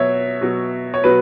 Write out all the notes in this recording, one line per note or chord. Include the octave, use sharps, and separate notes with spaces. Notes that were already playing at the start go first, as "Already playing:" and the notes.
Already playing: B2 F#3 C#5 E5
B2 F#3
C#5
B2 F#3 B4